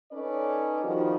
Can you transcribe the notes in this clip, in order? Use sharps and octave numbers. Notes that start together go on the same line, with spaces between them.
C#4 D#4 A4 B4 C#5 D5
D#3 F3 G3 D#4 F#4